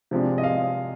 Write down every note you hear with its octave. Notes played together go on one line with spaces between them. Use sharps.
C3 F3 G#3 D4
D#5
F5